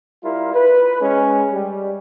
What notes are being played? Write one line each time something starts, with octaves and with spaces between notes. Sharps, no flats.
G3 E4 F4 A#4
B4
G#3 C#4
G3